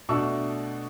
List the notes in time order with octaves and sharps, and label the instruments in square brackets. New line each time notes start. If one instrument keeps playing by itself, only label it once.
[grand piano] B2 A3 D4 C#6 E6